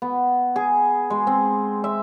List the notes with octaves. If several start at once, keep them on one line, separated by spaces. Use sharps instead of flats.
B3
G#4
G#3
C4
E5